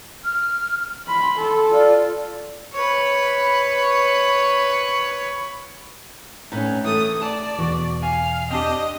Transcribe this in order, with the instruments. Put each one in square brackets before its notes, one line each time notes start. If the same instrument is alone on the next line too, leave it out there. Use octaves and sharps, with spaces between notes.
[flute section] F6
[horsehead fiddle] B5 [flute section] C6
[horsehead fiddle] A4
[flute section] F4 D5
[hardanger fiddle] B4 C#5
[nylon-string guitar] A2 C#4 [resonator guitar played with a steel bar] D#4 B4
[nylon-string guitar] E3 A3 A4 [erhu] D#6
[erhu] D5 [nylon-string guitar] A5
[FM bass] E2 [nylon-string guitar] B2 [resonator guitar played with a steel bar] F#4
[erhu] F5 [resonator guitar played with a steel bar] G#5
[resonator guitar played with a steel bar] C4 D4 G4 [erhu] D#5